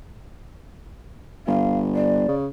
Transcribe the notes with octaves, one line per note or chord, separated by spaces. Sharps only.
G1 F5
D5
C#3